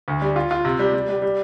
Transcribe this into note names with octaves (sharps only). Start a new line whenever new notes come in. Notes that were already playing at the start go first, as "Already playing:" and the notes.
D2
G3
F4
F4
C3
G3
G3
G3
G3